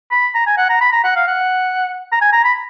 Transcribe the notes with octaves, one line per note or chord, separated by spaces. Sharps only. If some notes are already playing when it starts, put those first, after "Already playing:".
B5
A#5
G#5
F#5
A#5
B5
A#5
F#5
F5
F#5
A#5
G#5
A#5
B5